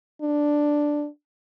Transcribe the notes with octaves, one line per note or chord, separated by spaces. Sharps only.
D4